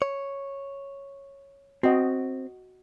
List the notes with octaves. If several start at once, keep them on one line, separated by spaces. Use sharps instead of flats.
C#5
C4 F#4 D#5